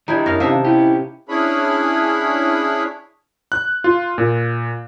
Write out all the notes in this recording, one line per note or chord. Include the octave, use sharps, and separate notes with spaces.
D#3 G3 D4 E4 A#5 G6 G#6
F#2 C#4 F5 A#6
C3 C#4 D#4 E5 F5 A5
C#4 E4 G4
C#4 D4 E4 G#4 C#5 B5
F#6
F4
A#2